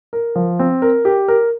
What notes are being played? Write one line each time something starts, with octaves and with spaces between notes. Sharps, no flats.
A#4
F3
C4
A#4
G4
A#4